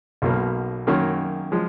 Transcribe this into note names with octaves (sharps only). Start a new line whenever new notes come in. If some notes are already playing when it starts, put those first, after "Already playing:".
B1 B2 A#3
F#2 D#3 A#3 C#4
F3 G#3